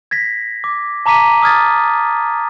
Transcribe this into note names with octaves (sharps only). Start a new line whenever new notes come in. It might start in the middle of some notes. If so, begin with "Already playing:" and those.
G#6 A#6 B6
D6
A5 A#5 D6 B6 D#7
D#6 F6 G#6 A6